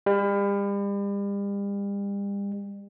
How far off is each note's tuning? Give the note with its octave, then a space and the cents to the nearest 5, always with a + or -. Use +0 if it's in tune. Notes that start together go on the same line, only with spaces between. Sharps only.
G3 +40